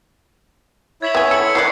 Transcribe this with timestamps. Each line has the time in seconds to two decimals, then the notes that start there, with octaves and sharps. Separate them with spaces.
1.02 E4 C#5 E5 G#6 B6 F#7
1.15 B3 G#5 D#6
1.31 A4 C#7 F#7
1.44 C6
1.55 E3 A4 D5 F#6 C7